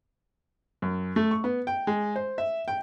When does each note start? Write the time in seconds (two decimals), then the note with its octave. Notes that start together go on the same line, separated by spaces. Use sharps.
0.82 F#2
1.16 A3
1.31 C#6
1.44 B3
1.67 G5
1.87 G#3
2.16 C5
2.38 E5
2.68 G5